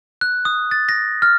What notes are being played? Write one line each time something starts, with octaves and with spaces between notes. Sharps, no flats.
F#6
D#6
A6
A#6
F6